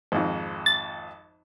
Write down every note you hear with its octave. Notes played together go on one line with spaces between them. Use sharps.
G#1 F2
A6